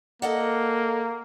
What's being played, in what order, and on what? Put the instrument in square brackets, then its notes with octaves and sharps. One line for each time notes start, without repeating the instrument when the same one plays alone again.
[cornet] A#3 [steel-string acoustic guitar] A4 D#5 F#5